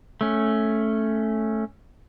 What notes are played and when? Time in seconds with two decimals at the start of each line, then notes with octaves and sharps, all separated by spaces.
0.21 A3 C#4